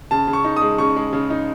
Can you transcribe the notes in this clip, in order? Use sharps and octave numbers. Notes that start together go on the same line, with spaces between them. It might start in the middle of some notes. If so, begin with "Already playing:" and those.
C#3 A5
C#3
C#6
D#4
G#3 D#6
C#3 C#6
G#3
C#3
D#4